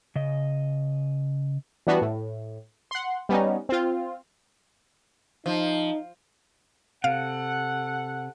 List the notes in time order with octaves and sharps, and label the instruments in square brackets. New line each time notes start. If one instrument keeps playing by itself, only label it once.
[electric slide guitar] C#3 D#5
[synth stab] E3 G3 B3 D4 F#4
A2
F#5 C6
G3 B3 C#4 D#4
C4 F4
[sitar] F3 [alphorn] D#4
[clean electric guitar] C3 [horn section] A4 F#5 [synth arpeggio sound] F5